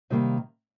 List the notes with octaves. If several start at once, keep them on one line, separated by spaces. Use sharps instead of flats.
C3 D#3 G3 A#3